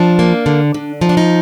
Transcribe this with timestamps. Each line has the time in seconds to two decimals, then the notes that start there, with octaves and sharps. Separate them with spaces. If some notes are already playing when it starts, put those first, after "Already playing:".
Already playing: F3 D4
0.19 A#3
0.46 D3
0.74 D3
1.01 F3 D#4
1.09 D4
1.17 D#4